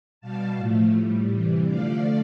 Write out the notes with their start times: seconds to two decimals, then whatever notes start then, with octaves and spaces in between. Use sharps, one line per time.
0.21 B2 G3 F5 A5
0.57 A2 F3 A3
0.94 A2 G3
1.30 C3 E3 G3
1.66 D3 F3 A3 D5 F5